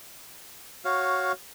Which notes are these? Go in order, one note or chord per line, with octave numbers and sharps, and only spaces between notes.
F#4 C#5 F5